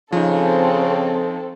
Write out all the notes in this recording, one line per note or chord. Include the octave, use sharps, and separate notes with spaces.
C#3 F3 C4 D#4 A4